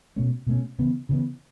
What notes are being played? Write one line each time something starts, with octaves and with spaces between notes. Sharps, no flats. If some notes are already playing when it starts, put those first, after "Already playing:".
B2 A3 C#4
B2 A3 C#4
C#3 E3 B3
C#3 E3 B3